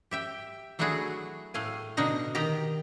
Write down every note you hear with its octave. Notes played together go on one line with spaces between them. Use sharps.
G4 E5 G5
F#3 A3 D4 E4 F#4 G#4
A2 A3 F5 G#5
B2 D3 D4 D#4 A#5
D#3 D#4 G4 A#5